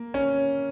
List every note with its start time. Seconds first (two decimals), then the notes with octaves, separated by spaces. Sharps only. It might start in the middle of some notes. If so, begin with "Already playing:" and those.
Already playing: A#3
0.14 C#4